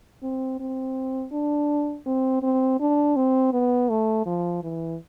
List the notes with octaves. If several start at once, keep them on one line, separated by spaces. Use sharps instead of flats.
C4
C4
D4
C4
C4
D4
C4
B3
A3
F3
E3